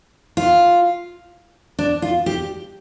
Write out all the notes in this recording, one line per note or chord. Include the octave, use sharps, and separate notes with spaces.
F4
D4
F4
G4